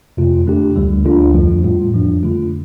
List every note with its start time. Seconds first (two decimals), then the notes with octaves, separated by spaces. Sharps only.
0.17 F2 C3 A3 F4
0.46 D3 A3 D4 G4
0.76 D2 D3 G3
1.05 D2 D3 A3 D4 F4
1.34 F2 F3 A3 F4
1.63 A2 G3 F4
1.93 F2 F3 D4
2.23 D3 A3 F4